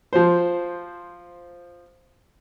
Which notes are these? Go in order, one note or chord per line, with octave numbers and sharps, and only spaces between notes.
F3 C5